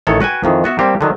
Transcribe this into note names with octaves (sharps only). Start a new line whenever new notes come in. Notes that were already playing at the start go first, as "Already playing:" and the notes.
A1 D#3 A4 C#5
F#4 B4 G5 G#5
F2 D#3 E3
B3 F#4 E5
G3 A#3 C4 G4
D3 D#3 F#3